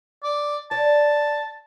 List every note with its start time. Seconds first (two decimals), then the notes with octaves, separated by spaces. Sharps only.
0.23 D5
0.71 C#5 D5 A5